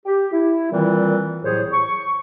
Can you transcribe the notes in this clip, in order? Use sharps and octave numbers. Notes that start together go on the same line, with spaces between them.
G4
E4
A#2 D#3 E3 G3 C4 F4
C2 A2 F#3 G#4 C5 C#5
C#6